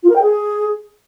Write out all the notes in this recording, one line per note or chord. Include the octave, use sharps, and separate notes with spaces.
F4
A#4
G5
G#4